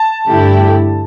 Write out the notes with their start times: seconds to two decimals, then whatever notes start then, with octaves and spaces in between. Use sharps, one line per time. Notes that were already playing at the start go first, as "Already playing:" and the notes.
Already playing: A5
0.28 G2 D3 A3 E4 G4